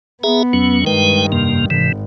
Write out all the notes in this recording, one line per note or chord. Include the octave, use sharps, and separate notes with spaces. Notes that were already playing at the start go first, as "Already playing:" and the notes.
B3 G#4 E5 A#5
E2 F#3 C#4
G2 D#3 G#3 B4 G5
F2 C3 A#3
G#1 C3 E3